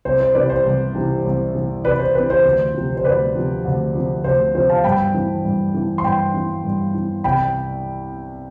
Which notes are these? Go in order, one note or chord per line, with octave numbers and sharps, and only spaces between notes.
C2 C5
C5
C3 E3 B4 D5
C5
C2
C3 E3
C2
C3 E3
C2 B4 D5
C5
C3 E3 B4
C5
D2
C3 F3
C5
D2 B4 D5
C3 F3
D2
C3 F3
D2 C5
C3 F3 C5
F5 A5
G2 G5 B5
E3
G2
E3
C6
G2 G5 B5
E3
G2
E3
C2 G5 B5